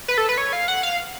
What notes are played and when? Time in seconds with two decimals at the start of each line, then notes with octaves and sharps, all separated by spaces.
0.08 B4
0.18 A4
0.29 B4
0.38 C#5
0.53 F5
0.68 F#5
0.83 F5